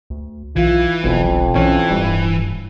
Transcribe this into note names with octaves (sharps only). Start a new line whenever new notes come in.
D2
B1 E3 F4
F1 B1 F2
B1 E3 C#4
D1 G2